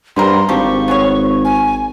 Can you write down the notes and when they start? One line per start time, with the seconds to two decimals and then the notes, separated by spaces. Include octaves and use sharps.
0.16 G2 B3 C4 A#4 C6
0.49 G#1 F3 A#3 G4 C#6
0.88 B3 G#4 C#5
1.45 G#5